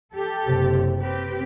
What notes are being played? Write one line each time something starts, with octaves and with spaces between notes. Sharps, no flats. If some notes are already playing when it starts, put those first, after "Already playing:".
G4 A4
F#1 C3
C4 G4 B4